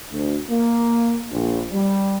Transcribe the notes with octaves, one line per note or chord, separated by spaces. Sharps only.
D2
A#3
A#1
G3